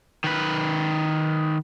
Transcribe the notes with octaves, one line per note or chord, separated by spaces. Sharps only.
D#3 B4